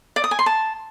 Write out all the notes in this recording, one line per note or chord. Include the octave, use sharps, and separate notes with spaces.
D5
D#6
G#5
C6
A5